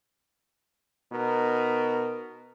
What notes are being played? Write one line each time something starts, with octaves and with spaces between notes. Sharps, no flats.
B2 D#4 A#4